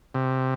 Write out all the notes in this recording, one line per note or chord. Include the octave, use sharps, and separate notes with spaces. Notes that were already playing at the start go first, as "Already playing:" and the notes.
C3